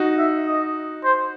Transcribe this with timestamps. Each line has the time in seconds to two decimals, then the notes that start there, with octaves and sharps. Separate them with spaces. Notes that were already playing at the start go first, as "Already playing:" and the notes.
Already playing: D#4 F#4
0.18 E5
0.46 D#5
1.04 C5